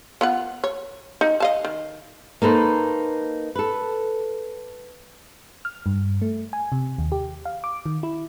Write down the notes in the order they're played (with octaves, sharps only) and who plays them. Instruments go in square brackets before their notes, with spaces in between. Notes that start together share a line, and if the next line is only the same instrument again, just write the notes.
[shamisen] B3 F4 F#5
C#5
D#4
D#5 F5 A5
D#3
[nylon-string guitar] A#3 D#4 A4 B4 C5
A4 B4
[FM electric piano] F6
G2
A3
G#5
C3
D#2
G4
F5
D6
D#3
E4